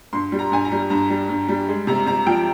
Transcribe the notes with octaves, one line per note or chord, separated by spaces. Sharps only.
G2 C6
G3
A#5
G2 G#5
A#5
G3
G2 A#5
G3
G2
G3
G#3
C3 A#5
C3 A#5
F3 G5